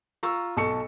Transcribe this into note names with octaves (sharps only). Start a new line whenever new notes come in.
F4 A#5 C#6 E6
B1 A4 C#6 C#7